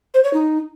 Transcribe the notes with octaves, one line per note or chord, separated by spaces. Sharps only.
C5
C#5
D#4